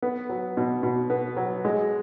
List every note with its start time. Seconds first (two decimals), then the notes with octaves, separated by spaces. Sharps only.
0.02 B3
0.29 F#3
0.57 B2
0.83 B2
1.10 B3
1.37 F#3
1.65 G#3